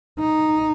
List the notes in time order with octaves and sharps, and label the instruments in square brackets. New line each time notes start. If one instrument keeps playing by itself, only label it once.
[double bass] D#4